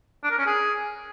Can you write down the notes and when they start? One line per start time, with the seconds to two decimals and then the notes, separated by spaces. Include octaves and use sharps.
0.24 D4
0.31 A#4
0.39 C#4
0.46 G#4